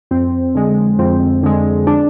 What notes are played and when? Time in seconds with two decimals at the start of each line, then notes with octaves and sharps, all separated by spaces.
0.11 F2 C4
0.55 D3 G#3
0.99 F2 C4
1.43 D3 G#3
1.87 D4